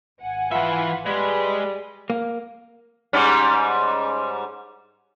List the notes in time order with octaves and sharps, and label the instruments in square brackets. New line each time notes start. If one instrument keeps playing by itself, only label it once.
[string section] G#1 F#5 G#5
[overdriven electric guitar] E3 E5 [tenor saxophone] F4 [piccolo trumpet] B4
[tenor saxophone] G3 [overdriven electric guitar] G#3 [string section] G#4 [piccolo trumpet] B4
[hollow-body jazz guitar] A#3
[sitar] G#2 G3 C#4